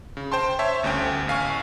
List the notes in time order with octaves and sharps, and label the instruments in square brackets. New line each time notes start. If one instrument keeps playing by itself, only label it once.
[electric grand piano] C#3
C5 G5 A5 C6
C5 C#5 E5 A5
G1 D2 G2 C#4 G5
A1 F5 G#5 C#6